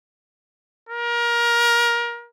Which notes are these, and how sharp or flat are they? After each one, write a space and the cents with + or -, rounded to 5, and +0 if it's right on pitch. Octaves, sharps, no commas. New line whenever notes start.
A#4 +25